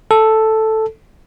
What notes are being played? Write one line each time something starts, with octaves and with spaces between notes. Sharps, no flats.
A4